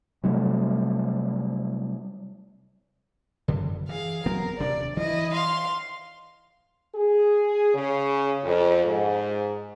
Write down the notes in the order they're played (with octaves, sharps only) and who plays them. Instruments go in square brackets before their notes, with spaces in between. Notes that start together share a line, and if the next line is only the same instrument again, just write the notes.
[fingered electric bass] C3 F#3 G3 A3
[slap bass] F#2 D3
[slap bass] E3 [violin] G#4 F5
[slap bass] F#3 B3 C4 [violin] A#4
[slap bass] D#1 C3 D4 [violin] D5
[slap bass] E3 [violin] E4 D#5
[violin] F5 C6
[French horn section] G#4
C#3
F2
G#2